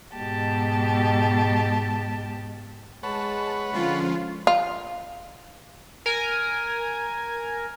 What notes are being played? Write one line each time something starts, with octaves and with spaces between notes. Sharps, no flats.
G#2 B2 G4 A5
G#3 B4 C#5 F#5 A5
D3 F3 G#3 C#4 F4
F4
A#4 G#5